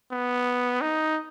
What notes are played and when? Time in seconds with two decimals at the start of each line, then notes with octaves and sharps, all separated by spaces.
0.12 B3
0.81 D#4